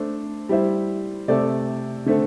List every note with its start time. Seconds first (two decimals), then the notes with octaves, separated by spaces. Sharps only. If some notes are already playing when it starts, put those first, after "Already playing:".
Already playing: A3 D4 A4 C5
0.49 G3 E4 C5 E5
1.28 C3 A3 C4 A4 D5
2.06 D3 A3 C4 A4